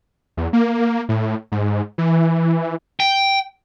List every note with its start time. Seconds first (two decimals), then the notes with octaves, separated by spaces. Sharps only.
0.37 E2
0.53 A#3
1.09 A2
1.52 G#2
1.98 E3
3.00 G5